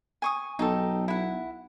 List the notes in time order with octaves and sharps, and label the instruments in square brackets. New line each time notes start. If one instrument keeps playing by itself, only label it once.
[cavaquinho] G#5 C#6 D#6
[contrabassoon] B1 [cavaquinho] D#4 G4 A4
[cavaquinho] E4 F#5